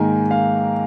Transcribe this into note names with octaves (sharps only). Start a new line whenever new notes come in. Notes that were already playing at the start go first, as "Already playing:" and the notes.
Already playing: G#2 D#3 A#3 G#5
F5